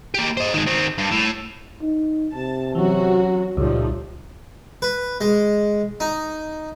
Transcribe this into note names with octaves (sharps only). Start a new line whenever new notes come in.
A#3 G4
C5 D#5
D#3 G#3
D#3 C4
G2
A2
D#4
C3 A5
E3 F#3 C4 C#4 F#4
C#2 A#2 F3 G3 A3 D#4
B4
G#3
D#4